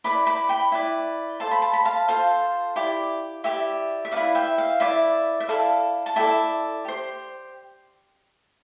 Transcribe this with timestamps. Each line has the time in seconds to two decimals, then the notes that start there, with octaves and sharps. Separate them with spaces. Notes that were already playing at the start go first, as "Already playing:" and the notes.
0.04 E4 B4 D5 B5 D6
0.26 B5 D6
0.49 G5 B5
0.72 E4 B4 D5
1.40 F4 A4 C5 A5
1.51 B5
1.62 A5
1.73 B5
1.85 F5 A5
2.08 F4 A4 C5 F5
2.76 E4 G4 D5
3.44 E4 G4 D5 E5
4.05 E5
4.12 E4 B4 D5 F5
4.35 E5 G5
4.58 F5
4.80 E4 B4 D5 E5
5.40 E5
5.49 E4 A4 D5 F5
6.06 A5
6.16 E4 A4 D5 E5 G5
6.85 G4 C5